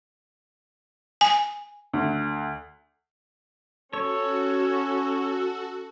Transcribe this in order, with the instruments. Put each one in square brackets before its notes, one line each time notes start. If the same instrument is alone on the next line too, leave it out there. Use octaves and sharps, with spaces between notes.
[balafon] G#5
[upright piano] D2
[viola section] C#4 [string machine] F#4 [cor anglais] A4 [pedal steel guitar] C#5